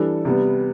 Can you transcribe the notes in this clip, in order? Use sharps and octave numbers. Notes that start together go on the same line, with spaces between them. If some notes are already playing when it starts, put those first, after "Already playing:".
Already playing: E3 G3 D4 A4
C3 G3 B3